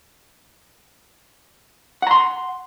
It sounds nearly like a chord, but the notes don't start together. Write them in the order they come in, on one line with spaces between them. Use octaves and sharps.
F#5 A#5 C6